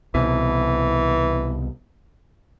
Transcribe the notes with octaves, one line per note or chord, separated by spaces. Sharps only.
C2 B2 E3